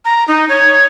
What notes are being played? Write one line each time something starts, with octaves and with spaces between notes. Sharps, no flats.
A#5
D#4
C#5